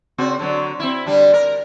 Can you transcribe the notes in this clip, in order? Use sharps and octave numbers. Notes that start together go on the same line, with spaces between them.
C#3 C4 F#4
D3 F#3
C4 E4
D3 G3 D4
A#4